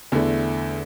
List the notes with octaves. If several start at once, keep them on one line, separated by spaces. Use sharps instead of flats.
E2 D3 A3 E4